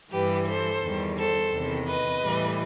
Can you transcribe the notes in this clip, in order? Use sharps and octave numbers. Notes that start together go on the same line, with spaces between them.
G2 E3 G3 G4 B4
A4 C5
E2 D#3 G3
A4 C5
E2 C3 D#3
B4 D#5
A2 E3 G3